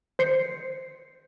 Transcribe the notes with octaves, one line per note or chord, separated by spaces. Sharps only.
C5 C7 C#7